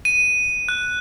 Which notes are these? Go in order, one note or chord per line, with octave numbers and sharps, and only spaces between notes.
D#7
F#6